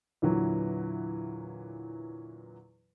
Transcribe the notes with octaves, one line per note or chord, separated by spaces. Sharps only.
E2 A#2 D3 E3 F#3